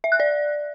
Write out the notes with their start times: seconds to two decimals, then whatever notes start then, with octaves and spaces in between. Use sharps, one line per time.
0.04 E5
0.12 F#6
0.20 D5